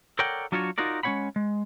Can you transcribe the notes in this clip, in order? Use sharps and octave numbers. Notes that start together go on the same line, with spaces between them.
A4 A#4 C#5 D5 F#5 G5
F#3 D4 F4 F#4 C5 C#5
D#4 F4 F#4 A#4 D5
G#3 C#4 D4 C#5 F#5 B5
G#3